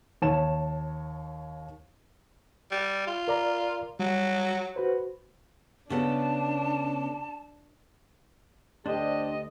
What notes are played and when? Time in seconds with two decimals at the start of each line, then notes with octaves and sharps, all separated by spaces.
0.22 D#2 C#5 A5 E7
2.71 G3
3.07 F4
3.28 A#4 D5 A#5
3.99 F#3 G3
4.76 F#4 B4 C5
5.90 C#3 B3 D4 A4 A5
8.86 D2 D4 G4 C5 D#5